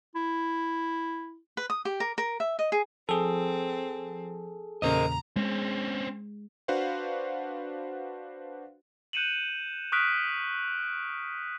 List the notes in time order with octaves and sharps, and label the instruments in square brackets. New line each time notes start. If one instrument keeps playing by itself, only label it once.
[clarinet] E4
[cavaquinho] B4
D#6
G4
A#4
A#4
E5
D#5
G#4
[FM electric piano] F3 [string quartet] C4 [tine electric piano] G#4 A4
[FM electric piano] E2 A#2 C#3 [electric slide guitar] A#4 C5 D#5 [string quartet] A#5
[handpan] G#3 [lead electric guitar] C4 C#4
[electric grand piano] D4 F#4 B4 C5 F5 F#5
[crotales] F#6 G6 C#7 D#7 E7 F#7
C#6 D#6 F6 F#6 B6 D7